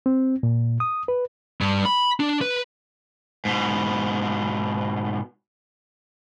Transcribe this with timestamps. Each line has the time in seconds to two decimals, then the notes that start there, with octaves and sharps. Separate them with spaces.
0.06 C4
0.43 A#2
0.80 D#6
1.08 B4
1.61 G2
1.85 B5
2.20 D4
2.41 B4
3.45 G#2 B2